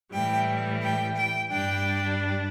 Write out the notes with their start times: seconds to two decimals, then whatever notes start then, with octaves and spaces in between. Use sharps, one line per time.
0.12 A2 E3 G3 G5
0.81 G5
1.16 G5
1.51 G2 G3 D4 G5